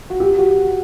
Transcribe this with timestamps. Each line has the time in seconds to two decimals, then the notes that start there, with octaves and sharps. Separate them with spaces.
0.10 F#4
0.20 G4
0.39 F#4